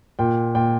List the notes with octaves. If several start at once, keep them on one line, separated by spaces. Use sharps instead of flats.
A#2 G5
A#2 G5